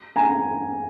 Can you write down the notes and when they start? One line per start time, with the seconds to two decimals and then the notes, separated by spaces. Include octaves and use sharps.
0.16 G#5 A#5